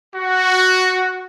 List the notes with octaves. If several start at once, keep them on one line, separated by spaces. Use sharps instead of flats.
F#4